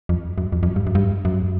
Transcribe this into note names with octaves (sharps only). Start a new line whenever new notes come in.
F2
F#2
F2
F2
F#2
G2
F#2
G2
F#2